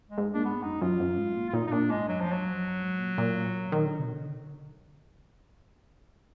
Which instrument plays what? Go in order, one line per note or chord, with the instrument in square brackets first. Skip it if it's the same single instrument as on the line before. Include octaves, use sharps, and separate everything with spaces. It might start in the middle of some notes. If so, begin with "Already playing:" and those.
[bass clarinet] G#3
[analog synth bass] G#2
[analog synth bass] A#2 [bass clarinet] D4
[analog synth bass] G#2 [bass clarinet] B3
[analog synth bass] F#2 [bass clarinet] D#4
[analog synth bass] F#2 [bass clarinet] F4
[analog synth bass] F#2
G#2
A#2
[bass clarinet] F4
[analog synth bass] A#2 [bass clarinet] D#4
[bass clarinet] D#4
[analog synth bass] A#2 [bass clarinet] D4
[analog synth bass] G#2 [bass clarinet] G#3
[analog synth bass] F#2 [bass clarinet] F#3
[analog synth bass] F2 [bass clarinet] F3
[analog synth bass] F#2 [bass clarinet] F#3
[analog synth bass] F2
F#2
G#2
A#2
A#2
D#3
D3
B2
D3